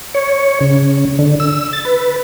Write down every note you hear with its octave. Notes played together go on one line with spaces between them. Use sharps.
C#5
C#3
D3
E6
A6
B4